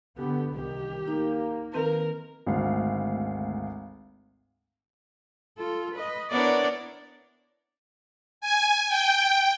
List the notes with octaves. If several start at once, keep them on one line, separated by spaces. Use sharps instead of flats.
D3 B3 G4
C2 D#3 G4
A#3 D#4
D#3 C4 A#4 B4
G#1 D2 F5
F4 A4
B4 D#5
B3 D4 E4 A#4 C#5 D5
G#5
G5